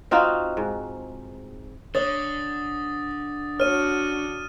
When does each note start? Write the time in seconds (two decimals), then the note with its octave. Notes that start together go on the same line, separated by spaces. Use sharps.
0.11 C4 D#4 F4 F#4
0.57 G#2
1.95 D3 C#5 D#6 A6
3.60 D4 F#4 C#5 F6 D#7